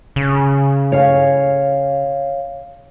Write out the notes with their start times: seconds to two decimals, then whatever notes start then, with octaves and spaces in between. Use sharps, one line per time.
0.16 C#3
0.92 C#5 F5 G#5